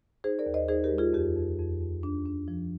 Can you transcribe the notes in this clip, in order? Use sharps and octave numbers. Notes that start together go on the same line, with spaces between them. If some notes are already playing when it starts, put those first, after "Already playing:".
D#4 G#4 C5
A#4 D5
D#2
C5 D#5
D#4 G#4 C5
G4 A#4
G#3
F4 G#4
F2 G4
F2
F2
F2
D4
D4
F3